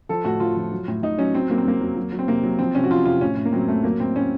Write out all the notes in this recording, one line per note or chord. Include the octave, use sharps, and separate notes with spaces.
F3 A4
A2 F#4
F3 F4
F3
F#3
A2
A2 D#4
F#3 C#4
F#3 C4
F#3 A#3
C4
F#3 A#3
F#3
F#3
F#3
C4
C3 A#3
F#3
F3 C4
C3 C#4
F#4
F3 F4
C3 F4
A2 C#4
A2
A#3
F#3 C4
F#3 A3
F#3 A#3
A2 C4
A2 C#4